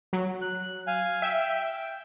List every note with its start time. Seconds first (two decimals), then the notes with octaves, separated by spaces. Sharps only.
0.13 F#3
0.42 F#6
0.87 F5 G#5
1.22 E5 G5